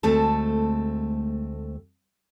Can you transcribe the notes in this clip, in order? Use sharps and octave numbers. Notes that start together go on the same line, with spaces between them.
D2 G#3 A3 C4 A4 A5